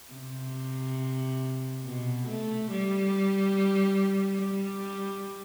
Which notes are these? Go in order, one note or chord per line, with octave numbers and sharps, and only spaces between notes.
C3
B2
A3
G3
G3